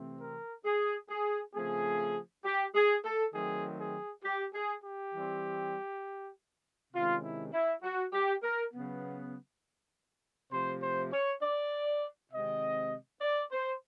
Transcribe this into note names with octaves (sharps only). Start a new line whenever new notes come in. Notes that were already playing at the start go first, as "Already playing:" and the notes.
Already playing: C3 E3 A3 C4
A#4
G#4
G#4
C#3 F3 A3 C4 G#4
G4
G#4
A4
D#3 F#3 A3 C4 G#4
G#4
G4
G#4
G4
E3 G3 C4
C3 D#3 G#3 C#4 F4
E4
E4
F#4
G4
A#4
C#3 F#3 B3
C3 F3 A3 C5
C5
C#5
D5
C3 D#3 G#3 C4 D#5
D5
C5